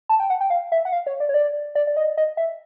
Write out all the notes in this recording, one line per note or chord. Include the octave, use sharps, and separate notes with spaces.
A5
G5
F#5
G5
F5
E5
F#5
F5
C#5
D5
C#5
D5
D5
D5
D#5
D#5
E5